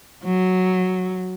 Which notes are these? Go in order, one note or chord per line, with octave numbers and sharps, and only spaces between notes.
F#3